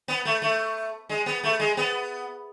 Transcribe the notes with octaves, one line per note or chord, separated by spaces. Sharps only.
B3
A3
A3
G#3
B3
A3
G#3
B3